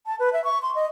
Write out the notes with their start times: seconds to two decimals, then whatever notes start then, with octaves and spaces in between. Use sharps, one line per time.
0.06 A5
0.19 B4
0.33 E5
0.44 C#6
0.62 C6
0.75 D#5